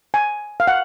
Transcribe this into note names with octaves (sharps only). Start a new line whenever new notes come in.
G#5
F5
F#5